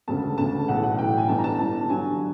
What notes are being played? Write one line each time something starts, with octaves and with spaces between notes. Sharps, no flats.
E1 D2 C#3 A5
E1 D2 C#3 A5
B1 A2 E3 F#5
F#5
B1 A2 E3 G5
G#5
G1 G2 E3 A5
A#5
A5
G1 G2 E3 A5
G2 D3 F#3 G#5